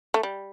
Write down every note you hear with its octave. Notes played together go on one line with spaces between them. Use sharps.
A3
G3